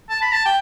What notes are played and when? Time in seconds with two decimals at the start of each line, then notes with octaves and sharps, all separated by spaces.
0.09 A5
0.22 B5
0.33 A5
0.45 G5